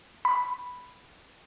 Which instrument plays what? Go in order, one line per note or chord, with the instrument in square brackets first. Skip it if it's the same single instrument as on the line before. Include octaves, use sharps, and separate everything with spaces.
[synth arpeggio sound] B5